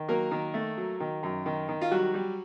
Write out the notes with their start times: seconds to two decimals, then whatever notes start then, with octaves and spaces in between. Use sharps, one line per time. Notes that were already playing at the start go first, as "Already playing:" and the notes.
Already playing: D#3
0.08 F#3 A#3 A#4
0.31 D#3
0.54 A3
0.78 F#3
1.00 D#3
1.23 F#2
1.46 D#3
1.69 D#3
1.81 F4
1.91 F#3 G3 F#4
2.14 G3